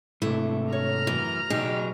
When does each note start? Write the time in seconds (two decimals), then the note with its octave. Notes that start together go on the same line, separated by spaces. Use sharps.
0.22 G#2 C3 A3 E4
0.73 C#5 A#5 F6
1.07 F#2 E3
1.50 B2 F#3 D#4 G4 G#4